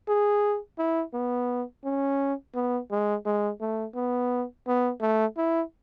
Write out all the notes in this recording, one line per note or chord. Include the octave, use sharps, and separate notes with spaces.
G#4
E4
B3
C#4
B3
G#3
G#3
A3
B3
B3
A3
E4